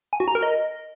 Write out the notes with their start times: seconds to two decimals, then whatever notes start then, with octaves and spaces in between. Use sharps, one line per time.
0.13 G#5
0.20 F#4
0.28 A#5
0.35 A#4
0.43 D#5